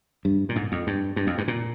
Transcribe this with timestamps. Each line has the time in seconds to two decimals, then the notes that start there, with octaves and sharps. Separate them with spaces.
0.25 G2
0.49 A#2
0.56 G#2
0.72 F2
0.87 G2
1.16 G2
1.27 F2
1.38 G2
1.48 A#2